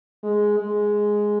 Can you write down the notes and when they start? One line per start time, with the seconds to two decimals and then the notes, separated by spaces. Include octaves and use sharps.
0.23 G#3
0.59 G#3